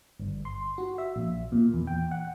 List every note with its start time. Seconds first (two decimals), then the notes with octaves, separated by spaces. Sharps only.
0.20 G1
0.45 C6
0.78 F#4
0.98 E5
1.16 A#1
1.52 A#2
1.73 E2
1.87 G5
2.11 F#5